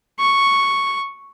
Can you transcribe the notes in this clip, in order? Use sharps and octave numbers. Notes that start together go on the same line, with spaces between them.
C#6